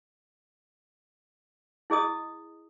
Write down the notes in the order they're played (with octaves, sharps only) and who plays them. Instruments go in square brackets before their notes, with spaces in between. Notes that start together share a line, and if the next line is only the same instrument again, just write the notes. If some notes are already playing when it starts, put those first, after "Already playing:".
[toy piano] E4 G#4 D#5 D#6